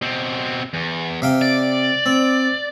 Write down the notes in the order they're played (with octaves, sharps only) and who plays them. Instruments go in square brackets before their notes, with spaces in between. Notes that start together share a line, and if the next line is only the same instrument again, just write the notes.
[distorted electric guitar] B2 C4
E2
[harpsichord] C3 F5 G5
[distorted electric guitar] D5
[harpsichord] C4